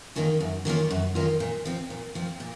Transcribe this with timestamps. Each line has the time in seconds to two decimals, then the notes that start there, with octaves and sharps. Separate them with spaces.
0.16 D#3 A#3 C#4 F4
0.40 F#2
0.65 D#3 A#3 C#4 F4
0.91 F#2
1.15 D#3 A#3 C#4 F4
1.40 A#2
1.65 F3 C4
1.90 A#2
2.15 F3 C4
2.40 A#2